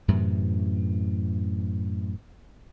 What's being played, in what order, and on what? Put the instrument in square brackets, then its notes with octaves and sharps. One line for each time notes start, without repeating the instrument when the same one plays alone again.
[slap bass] F#2 A2 C3 E3